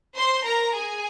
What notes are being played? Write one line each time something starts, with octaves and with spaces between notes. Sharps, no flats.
C5 C6
A#4 A#5
G#4 G#5